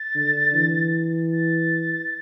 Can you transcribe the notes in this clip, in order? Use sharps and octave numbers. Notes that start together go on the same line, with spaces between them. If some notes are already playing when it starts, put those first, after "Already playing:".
Already playing: A6
D3
E3
A6